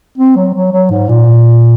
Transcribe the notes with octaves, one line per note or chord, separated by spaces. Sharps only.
C4
F#3
F#3
F#3
G#2
A#2